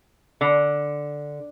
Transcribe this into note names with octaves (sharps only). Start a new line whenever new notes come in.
D3